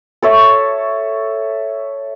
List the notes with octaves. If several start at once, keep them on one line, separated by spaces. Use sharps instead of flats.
A4 C#5 E5